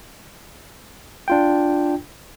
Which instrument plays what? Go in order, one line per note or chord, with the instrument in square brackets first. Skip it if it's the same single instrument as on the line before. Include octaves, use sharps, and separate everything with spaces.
[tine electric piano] D4 F4 G5